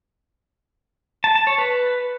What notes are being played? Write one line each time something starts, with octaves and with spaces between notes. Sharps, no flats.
A5
A5
C#5
B4